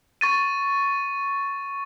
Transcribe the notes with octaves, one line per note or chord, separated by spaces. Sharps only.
C#6 A6 D#7